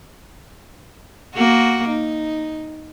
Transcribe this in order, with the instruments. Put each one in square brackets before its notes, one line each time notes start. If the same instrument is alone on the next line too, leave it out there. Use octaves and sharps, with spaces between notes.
[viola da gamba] A#3 F#4
D#4